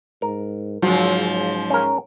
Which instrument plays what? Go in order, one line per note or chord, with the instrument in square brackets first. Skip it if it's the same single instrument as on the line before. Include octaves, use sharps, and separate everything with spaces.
[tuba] G#2 [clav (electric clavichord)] A#4
[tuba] G#2 [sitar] C#3 F3 [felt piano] F#3
[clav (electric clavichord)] C#4 A#4